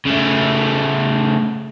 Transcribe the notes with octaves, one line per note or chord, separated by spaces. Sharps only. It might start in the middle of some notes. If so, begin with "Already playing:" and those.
C#3 A3